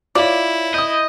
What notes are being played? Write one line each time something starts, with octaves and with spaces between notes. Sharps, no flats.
E4 F4 C#5 D5
D#5 D#6 G6